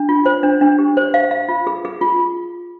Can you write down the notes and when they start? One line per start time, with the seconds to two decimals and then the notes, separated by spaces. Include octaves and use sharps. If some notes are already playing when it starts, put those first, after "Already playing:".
Already playing: D4
0.09 F4
0.26 C5
0.43 D4
0.61 D4
0.79 G4
0.97 C5
1.14 F5
1.31 F5
1.49 F4
1.67 G#4
1.85 G#4
2.01 F4